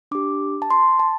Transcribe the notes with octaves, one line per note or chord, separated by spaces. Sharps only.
D4 G4 D6
A5
C6
A5